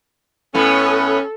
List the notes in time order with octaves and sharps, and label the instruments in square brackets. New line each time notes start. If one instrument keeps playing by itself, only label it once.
[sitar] A2 B3 [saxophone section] C#4 [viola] A4